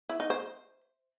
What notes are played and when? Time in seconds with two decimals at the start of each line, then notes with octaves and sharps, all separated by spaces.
0.09 E4
0.20 D#4
0.30 C5